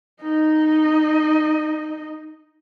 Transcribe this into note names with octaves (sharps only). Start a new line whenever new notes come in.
D#4 D#5